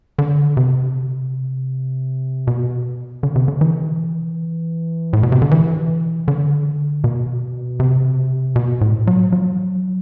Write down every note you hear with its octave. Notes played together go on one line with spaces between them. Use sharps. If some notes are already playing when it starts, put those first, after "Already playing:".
D3
C3
B2
D3
C3
D3
E3
A2
B2
C3
D3
E3
D3
B2
C3
B2
A2
F#3
F#3